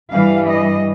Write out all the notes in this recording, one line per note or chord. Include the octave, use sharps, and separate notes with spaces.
G2 E3 G3 F5
D#5